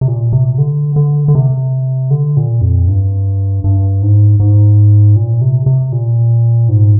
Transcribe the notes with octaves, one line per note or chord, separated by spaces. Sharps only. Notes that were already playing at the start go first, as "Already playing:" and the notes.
C3
A#2
C3
D3
D3
D3
C3
D3
A#2
F2
G2
G2
G#2
G#2
A#2
C3
C3
A#2
G#2